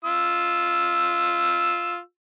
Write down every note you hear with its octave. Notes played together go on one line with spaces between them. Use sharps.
F4 E6